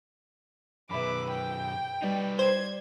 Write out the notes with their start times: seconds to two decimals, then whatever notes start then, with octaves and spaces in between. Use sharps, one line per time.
0.91 F#2 B2 G#4 B4 E5 B5 D6
1.31 G5
2.03 G3 D#4 B4 D5
2.39 C5 G#6